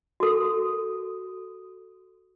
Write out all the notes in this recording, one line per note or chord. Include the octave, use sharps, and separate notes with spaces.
F#4 A4